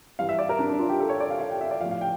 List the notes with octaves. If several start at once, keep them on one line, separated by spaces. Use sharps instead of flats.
G2 E3 F5
E5
D5
A#4
D4
D4
F4
G4
A4
C#5
D5
F5
F5
G5
E5
D5
A2 F3 F5
F5
G5